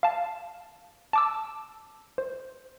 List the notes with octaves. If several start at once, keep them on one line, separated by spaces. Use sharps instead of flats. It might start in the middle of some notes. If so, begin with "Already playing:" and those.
F5 A5
A5 D6 E6
C5